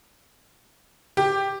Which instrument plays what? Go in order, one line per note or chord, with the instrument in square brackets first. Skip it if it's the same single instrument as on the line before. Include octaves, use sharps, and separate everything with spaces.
[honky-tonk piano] G4